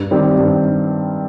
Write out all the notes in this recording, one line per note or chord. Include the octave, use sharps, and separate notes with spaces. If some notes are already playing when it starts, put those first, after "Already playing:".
Already playing: G2
D#3 G3 C4
G2